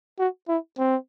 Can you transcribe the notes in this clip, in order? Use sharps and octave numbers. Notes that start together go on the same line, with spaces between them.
F#4
E4
C4